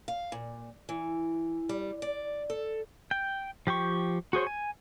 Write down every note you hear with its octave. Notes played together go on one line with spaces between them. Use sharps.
F5
A#2
E3
G3
D5
A4
G5
F3 G4 G5 C#6
F#4 G#4 C5 C#5
G#5